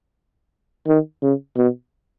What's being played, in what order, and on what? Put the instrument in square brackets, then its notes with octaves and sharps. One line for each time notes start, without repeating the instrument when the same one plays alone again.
[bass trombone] D#3
C#3
B2